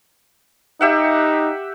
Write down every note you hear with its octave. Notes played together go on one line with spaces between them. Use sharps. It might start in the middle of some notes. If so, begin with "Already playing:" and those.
D#4 G4 E5 F#5